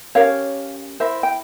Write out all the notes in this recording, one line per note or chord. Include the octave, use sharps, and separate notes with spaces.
C#4 G4 A#4 C#5 F5
E4 A#4 C5 E5
G5